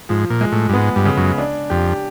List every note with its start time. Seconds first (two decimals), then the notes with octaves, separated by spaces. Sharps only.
0.09 G#2 F3
0.30 A#2
0.41 G#3
0.52 A2
0.69 G2
0.73 G#2 B3
0.96 G2
1.05 C#3
1.17 F#2
1.38 D4
1.70 F2 G4